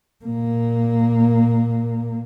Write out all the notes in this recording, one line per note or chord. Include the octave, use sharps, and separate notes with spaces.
A#2 A#3